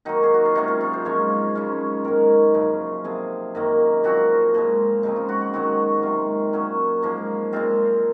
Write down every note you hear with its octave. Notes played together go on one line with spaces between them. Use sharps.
D#3 F#3 A#3 D#4
G#4
F#4
F4
C3 F#3 A#3 C#4 D#4
F4
F4
C5
G#2 F3 A#3 C#4 C#5
C#3 G#3 C#4
G#2 D#3 A#3 A#4
F#2 C#3 F3
C3 F3 C4 G#4
F#2 D#3 A#3
A#2 F3 C4 F#4
A#2 F3 G#3
C#3 F3 G#3 C4 D#4
F4
F#4
F#4
G#2 D#3 F#3 C4 F#4
C3 D#3 G#3 F4
A#2 F#3 C#4
G#2 F3 A#3
A#2 G#3 C4 F4